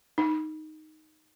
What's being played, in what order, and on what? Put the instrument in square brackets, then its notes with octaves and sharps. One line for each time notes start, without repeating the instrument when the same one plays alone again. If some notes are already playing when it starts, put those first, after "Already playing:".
[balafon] D#4